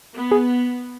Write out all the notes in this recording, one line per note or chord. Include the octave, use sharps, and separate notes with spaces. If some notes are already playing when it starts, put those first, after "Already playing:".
B3
G#4